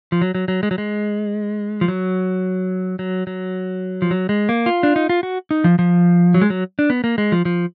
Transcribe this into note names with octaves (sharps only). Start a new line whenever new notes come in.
F3
F#3
F#3
F#3
G#3
F#3
G#3
F3
F#3
F#3
F#3
F3
F#3
G#3
A#3
F4
D4
D#4
F4
F#4
D#4
F3
F3
F#3
G#3
F#3
D4
B3
A#3
G#3
F3
F3